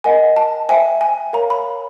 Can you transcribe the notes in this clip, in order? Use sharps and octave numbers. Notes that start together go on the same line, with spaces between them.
A#4 D#5 F#5 G#5
A5
C5 E5 G5 G#5
G#5
A#4 C#5 F5 A#5
B5